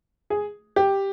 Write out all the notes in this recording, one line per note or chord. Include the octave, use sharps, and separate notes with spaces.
G#4
G4